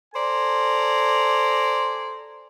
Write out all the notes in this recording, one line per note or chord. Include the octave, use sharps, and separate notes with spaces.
A4 C5 D5 G#5 A#5